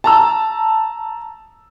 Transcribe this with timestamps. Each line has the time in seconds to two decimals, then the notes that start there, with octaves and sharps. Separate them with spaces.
0.04 A5 A#5 E6